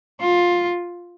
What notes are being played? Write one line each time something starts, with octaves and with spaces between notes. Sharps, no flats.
F4